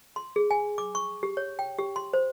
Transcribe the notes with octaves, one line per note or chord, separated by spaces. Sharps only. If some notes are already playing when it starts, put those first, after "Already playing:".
C6
G#4
G#5
D6
C#6
G4
C#5
G5
G4
C6
C5